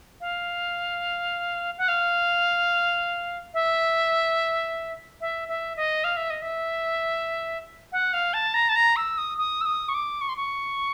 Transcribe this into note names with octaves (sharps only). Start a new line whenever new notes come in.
F5
F#5
F5
E5
E5
E5
D#5
F5
E5
D#5
E5
F#5
F5
A5
A#5
A5
A#5
E6
D#6
D#6
E6
D#6
C#6
D6
C#6
C6
C#6